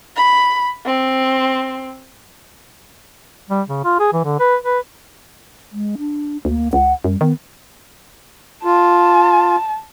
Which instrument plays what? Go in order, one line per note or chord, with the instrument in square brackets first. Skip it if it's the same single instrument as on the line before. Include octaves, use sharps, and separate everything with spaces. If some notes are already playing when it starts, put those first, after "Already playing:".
[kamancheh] B5
C4
[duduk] G3
C#3
F4
G#4
E3
D3
B4
B4
[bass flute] G#3
D4
[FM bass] D2 [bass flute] A#3
[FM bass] C#2 [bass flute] F#5
[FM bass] F#2 [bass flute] G3
[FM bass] D#3 [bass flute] B3
[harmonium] F4 [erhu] A5